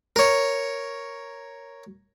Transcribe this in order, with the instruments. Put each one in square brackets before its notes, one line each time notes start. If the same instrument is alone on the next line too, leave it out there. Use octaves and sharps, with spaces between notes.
[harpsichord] A#4 C#5